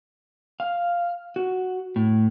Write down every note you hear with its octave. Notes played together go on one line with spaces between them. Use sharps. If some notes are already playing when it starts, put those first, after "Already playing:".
F5
F#4
A2